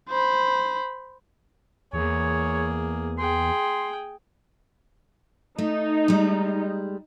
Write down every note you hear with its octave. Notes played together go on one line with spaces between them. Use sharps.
C5 B5
E2 A#3 G#4 C#5
G#4 G5 C6
A3 D#4
G3 G#3